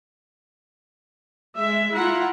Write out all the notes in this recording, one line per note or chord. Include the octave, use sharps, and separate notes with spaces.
G#3 E5
E4 F4 F#5 A#5